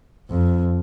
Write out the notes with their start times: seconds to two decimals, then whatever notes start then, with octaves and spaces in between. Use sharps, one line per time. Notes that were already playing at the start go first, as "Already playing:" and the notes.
0.29 F2